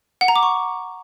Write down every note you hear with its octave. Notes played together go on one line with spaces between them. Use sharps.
F#5
A#5
D6
C#6